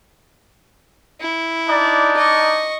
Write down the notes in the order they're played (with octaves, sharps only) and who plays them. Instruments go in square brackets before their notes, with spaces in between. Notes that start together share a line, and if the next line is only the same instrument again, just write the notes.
[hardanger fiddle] E4
[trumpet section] D4 D#4 D5
[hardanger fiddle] D#5 C#6